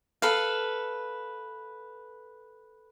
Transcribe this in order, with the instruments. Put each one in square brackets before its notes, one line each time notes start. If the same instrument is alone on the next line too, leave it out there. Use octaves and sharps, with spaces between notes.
[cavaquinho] A4 B4 F5